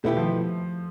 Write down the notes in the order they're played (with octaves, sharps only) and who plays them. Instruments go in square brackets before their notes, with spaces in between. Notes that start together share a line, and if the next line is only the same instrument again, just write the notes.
[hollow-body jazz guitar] B2 B3 E4 G4 [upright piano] A3
[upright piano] F3